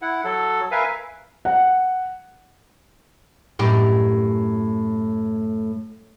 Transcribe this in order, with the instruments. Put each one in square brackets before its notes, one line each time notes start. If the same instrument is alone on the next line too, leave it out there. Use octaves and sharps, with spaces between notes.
[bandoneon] E4 F#5
F#3 A4
A#4 B4 E5 F5 G#5
[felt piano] F#5
[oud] F#2 A2 G4